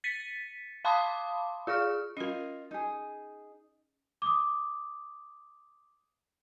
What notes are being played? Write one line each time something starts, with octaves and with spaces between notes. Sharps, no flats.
A6 B6 C#7 D#7
F5 A5 B5 C6 D6 D#6
F4 G#4 C#6 F6
C#4 F4 A#4 D#5
D#4 G#4
D6 D#6